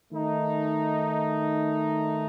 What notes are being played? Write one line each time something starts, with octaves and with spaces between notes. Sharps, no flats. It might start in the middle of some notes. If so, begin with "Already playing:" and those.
D#3 A3 D#4